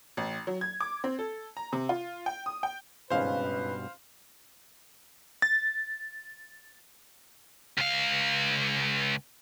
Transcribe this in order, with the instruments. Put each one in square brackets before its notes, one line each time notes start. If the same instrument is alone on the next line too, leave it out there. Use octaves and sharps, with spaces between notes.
[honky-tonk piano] A1
F#3
G#6
D6
C4
A4
A#5
C3
F4
G5
D#6
G5
[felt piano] G#1 C#2 C#4 [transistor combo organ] G2 B2 [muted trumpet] B4 [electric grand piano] C5 F5
[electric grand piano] A6
[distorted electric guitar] C#2 F5